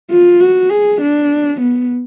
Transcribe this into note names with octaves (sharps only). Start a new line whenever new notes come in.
F4
F#4
G#4
D4
B3